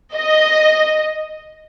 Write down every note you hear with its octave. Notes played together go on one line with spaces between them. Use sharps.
D#5